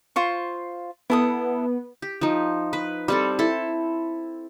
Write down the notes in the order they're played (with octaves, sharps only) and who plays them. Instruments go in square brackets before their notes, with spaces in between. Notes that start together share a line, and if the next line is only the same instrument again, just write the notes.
[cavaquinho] F4 C5 C#6
[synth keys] B3 [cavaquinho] E4 A4 D#6
[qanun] G4
F3 D#4
B4
G3 C4 A4
E4 A4